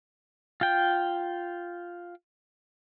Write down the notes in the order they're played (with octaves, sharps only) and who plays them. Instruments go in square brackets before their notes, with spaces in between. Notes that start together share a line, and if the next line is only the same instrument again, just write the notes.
[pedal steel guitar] F4 G5